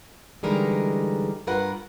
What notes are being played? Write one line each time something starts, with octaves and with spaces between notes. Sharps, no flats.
D3 E3 G3 G#3 D#4 A#4
G2 F4 A#4 B4 F#5